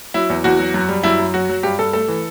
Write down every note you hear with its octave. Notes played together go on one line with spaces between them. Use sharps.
F#3 E4
E2
E2 F#4
F#3
F#2
G3
F#2 E4
F#2
F#3 F#4
F#3
G2 G4
G2 A4
A3 A4
E3